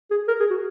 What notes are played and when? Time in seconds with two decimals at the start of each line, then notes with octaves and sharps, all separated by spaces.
0.11 G#4
0.28 A#4
0.40 G#4
0.50 F#4